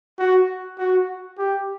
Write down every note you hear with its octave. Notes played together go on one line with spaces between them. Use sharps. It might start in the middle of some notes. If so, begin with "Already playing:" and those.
F#4
F#4
G4